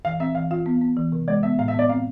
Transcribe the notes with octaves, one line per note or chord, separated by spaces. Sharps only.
E3 F5
C4 E5
E3 F5
F4 F5
B3
B3
E3
C3
G#3 D5
B3 E5
A2 F5
E5
B3 D5
C4 F5